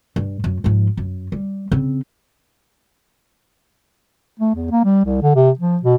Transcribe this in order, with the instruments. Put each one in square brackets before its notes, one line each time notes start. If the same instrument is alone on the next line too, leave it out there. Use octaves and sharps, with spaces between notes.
[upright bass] G2
F#2
G#2 F3
F#2
G3
C#3 C4
[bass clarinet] A3
E2
A#3
G3
C2
D3
C3
F3
B2